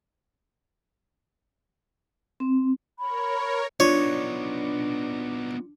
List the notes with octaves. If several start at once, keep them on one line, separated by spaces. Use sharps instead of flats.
C4
A#4 C#5 B5
B3 D4 D#4 F4 C#5